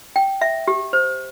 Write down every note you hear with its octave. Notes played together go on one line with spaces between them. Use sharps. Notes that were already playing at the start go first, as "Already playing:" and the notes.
G5
E5
G4
C5